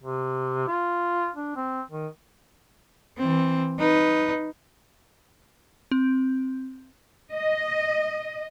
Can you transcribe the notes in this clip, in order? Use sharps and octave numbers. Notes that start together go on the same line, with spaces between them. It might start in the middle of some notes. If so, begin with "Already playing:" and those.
C3
F4
D4
C4
D#3
E3 C4
D#4 B4
C4
D#5